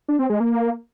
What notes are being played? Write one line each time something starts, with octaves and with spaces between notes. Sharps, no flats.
D4
C4
G#3
A#3